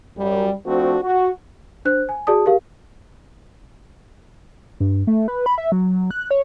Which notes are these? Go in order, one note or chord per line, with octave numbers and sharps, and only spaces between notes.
F#2 G3
F3 A3 C4 D4 F#4
F#4
D4 C5 F#6
G#5
F#4 G#4 D5 A5 D#6
G4 A#4 F5
G2
A3
B4
B5
E5
F#3
F#6
C#5